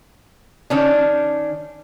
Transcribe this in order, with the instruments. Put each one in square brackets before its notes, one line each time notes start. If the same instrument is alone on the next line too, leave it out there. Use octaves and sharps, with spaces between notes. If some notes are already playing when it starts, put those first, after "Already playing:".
[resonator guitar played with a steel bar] D#3 C#4 D4